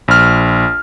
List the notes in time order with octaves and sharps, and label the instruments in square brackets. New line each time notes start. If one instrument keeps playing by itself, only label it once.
[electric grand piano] A#1 F6